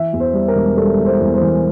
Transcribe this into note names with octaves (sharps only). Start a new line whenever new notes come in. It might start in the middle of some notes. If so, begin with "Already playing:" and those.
Already playing: E3 E5
E2
C5
G3
A#4
E1
G3 A4
E1
C5
E2
C5
E3